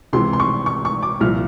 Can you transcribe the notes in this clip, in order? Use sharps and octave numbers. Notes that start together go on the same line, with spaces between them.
C#2 C3 E3 C6
C6
C#6
C#6
C#6
D6
C2 A#2 F3 F6